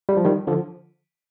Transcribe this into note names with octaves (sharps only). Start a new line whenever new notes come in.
G3
F3
D#3 G3
D3 F3